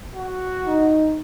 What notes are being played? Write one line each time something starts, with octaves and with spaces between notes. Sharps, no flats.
F#4
D#4